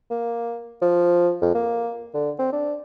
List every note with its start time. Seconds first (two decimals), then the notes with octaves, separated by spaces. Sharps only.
0.10 A#3
0.81 F3
1.42 F2
1.55 A#3
2.14 D3
2.39 C4
2.52 D4